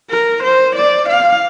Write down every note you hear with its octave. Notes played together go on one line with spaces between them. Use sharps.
A#4
C5
D5
F5